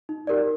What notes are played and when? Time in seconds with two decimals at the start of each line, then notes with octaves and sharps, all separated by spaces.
0.09 D#4
0.27 G4 A#4 D5